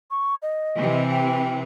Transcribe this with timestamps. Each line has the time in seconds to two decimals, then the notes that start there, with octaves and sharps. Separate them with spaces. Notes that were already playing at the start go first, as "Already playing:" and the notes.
0.11 C#6
0.42 D#5
0.76 C3 E3
1.10 G5